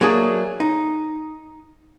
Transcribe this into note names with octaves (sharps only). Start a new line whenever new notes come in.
F#3 A3 A#3 D4 G#4
D#4